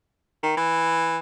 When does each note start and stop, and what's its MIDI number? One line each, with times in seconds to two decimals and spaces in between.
0.43 0.57 51
0.57 1.18 52